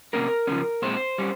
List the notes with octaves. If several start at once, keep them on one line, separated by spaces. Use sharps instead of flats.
C3 D#3 A#3 C#4 A#4
C#3 F3 G#3 C#4
A#2 G#3 C4 C5
G3 C#4